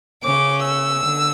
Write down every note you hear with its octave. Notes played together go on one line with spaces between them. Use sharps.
C#3 C#4 D6
E6
D3